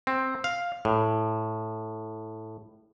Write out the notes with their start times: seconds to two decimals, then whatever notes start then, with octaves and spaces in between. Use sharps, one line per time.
0.07 C4
0.44 F5
0.85 A2